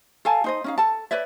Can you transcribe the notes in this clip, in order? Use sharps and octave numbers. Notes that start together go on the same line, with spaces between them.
A4 F5 G#5 A5
D#4 C5 D#5
C#4 D#4 F5
A4 A5
B4 C#5 D5 E5